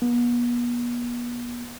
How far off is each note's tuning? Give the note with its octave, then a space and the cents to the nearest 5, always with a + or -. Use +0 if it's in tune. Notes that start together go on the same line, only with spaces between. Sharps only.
B3 -40